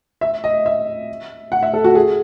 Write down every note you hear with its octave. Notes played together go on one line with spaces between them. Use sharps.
E5
D#5
E5
F#5
E5
A4
F#4
G#4